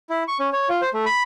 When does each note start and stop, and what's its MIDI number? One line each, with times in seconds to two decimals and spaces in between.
0.10 0.23 64
0.28 0.38 85
0.40 0.50 61
0.53 0.69 73
0.69 0.81 65
0.82 0.89 72
0.94 1.05 57
1.06 1.23 83